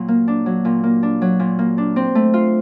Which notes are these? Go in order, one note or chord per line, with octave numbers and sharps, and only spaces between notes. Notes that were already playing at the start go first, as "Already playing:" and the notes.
Already playing: A#2 F#3
A#3
D4
F#3
A#2
A#3
D4
F#3
A#2
A#3
D4
C4
A3
F4